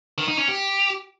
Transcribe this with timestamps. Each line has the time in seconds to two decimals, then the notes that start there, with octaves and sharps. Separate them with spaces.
0.18 D#3
0.28 D#4
0.38 C#4
0.48 G4